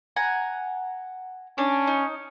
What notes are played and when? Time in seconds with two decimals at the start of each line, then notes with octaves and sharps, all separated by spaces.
0.16 F#5 G#5 A#5
1.58 C#4 D4
1.87 D#4